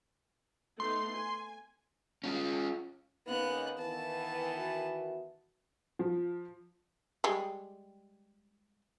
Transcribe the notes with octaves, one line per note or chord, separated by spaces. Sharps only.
A3 B3 D#4 C6
G#5
C#4 F4
C#3 A#3 B3 D#4 F5 F#6
D#3 E3 B3 A5
F#4 A#4 E5
F3
G3 G#3